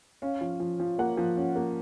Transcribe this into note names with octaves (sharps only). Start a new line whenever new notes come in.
C#4 F5
F3
F3
F3
A#3 F#5
F3
C#4
A#3